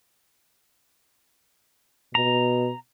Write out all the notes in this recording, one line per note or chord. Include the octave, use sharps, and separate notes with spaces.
B2 A#5